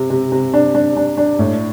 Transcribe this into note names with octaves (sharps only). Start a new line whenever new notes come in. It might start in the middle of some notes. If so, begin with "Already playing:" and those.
Already playing: C3
C3
C3
D4
D4
D4
D4
A2